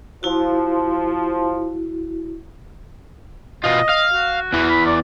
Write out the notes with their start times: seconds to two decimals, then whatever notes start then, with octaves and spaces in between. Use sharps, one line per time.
0.23 F3 E4 F#4
3.64 B2 F4 D#5
3.89 F5
4.14 F#4
4.53 E2 E3
4.70 B5
4.86 D5